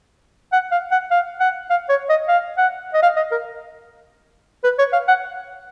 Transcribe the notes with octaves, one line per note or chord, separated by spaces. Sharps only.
F#5
F5
F#5
F5
F#5
F5
C#5
D#5
F5
F#5
D#5
F5
D#5
A#4
B4
C#5
F5
F#5